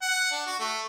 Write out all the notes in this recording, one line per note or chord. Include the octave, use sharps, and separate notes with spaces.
F#5
D4
F#4
A3